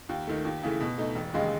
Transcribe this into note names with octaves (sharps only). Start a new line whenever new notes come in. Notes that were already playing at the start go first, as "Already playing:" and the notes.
D#2
D#3 A3
D#2
C#3 E3 A3
B2
A3 D#4
E1
D#2 C#3 G#3